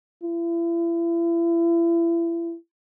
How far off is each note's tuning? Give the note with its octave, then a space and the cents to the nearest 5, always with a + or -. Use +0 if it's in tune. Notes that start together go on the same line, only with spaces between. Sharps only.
E4 +35